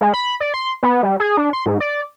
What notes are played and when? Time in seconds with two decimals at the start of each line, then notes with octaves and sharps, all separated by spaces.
0.01 G#3
0.14 B5
0.40 D5
0.54 C6
0.83 B3
1.03 G3
1.20 G#4
1.37 D4
1.53 C6
1.66 G#2
1.80 D5